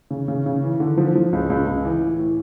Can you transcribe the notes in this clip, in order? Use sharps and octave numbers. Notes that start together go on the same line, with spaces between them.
C#3
C#3
C#3
E3
D3
F3
F3
C#2
C#2
C#2
E3
A2
A2